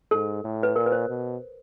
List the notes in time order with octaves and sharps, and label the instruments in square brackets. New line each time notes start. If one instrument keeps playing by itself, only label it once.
[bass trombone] G#2 [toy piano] A4
[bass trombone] A2
[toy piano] B4
[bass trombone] A#2 [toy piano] A#4
[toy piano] B4
C5
[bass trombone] B2